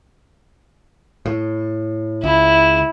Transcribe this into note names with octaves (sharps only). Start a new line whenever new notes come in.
A2
C#2 E4